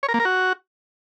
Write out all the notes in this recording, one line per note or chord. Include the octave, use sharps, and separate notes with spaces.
C#5
A#4
A#3
A#4
F#4